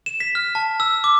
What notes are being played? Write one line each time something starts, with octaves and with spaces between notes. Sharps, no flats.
E7
B6
F6
A5
E6
D6